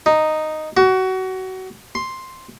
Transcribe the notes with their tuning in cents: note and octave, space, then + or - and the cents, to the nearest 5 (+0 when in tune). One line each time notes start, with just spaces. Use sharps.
D#4 -5
F#4 +25
C6 +5